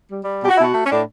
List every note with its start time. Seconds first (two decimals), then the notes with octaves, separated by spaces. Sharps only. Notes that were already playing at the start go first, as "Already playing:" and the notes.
0.09 G3
0.24 G3
0.41 B2 G4
0.49 F#4
0.56 B2 E4
0.63 F#4
0.73 A3
0.85 C#4
0.89 A2 D4